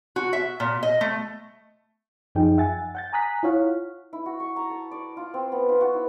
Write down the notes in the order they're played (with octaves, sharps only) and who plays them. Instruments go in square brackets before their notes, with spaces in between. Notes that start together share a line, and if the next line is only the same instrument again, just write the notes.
[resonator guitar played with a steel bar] F#4
E5
A#2
D#5
A3
[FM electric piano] F#2 F3 D#4 G#4 G5
E5 F#5 G#5 A6
F#5 G6 A6
G#5 A#5 D#6 F#6 B6
E4 F4 C#5 F5 F#5
[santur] E4
F#4
C#6
A#5
A5
D5
F4
C4
B3
F4
F#4
E4